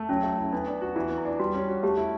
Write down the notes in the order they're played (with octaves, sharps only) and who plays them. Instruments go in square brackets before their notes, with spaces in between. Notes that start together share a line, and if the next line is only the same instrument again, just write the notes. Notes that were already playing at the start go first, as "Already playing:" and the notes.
Already playing: [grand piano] A3
[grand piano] F#3 [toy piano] C#4
[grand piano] A3
E4
[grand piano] B3 [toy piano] D4
[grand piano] D4
F#4
[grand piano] E3 [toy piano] E4
[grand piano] B3
[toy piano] E4
[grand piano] D4
[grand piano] G3 [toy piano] F#4
[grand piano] C#4
F#4
[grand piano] A3 [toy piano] G4
[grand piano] E4